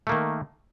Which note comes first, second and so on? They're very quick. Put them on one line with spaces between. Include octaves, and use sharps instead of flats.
A3 A#3 D#3